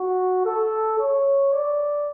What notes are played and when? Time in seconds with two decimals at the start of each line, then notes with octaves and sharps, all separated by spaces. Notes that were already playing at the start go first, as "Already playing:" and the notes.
Already playing: F#4
0.45 A4
0.99 C#5
1.53 D5